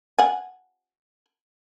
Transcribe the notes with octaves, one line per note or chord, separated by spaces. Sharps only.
F#5 G#5